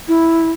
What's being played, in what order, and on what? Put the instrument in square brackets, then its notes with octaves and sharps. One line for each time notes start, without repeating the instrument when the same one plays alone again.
[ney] E4